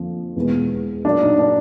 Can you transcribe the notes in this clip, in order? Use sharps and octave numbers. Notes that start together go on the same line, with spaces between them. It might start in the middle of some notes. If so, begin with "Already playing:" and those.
Already playing: F2 D3 F3 A#3
E2 B2 G#3 B3
A#2 F#3 A#3 D4
D#4
D4